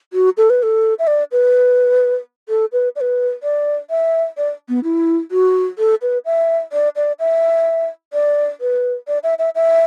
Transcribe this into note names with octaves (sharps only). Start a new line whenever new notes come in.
F#4
A4
B4
A4
E5
D5
B4
A4
B4
D5
B4
D5
E5
D5
B3
E4
F#4
A4
B4
E5
D5
D5
E5
D5
B4
D5
E5
E5
E5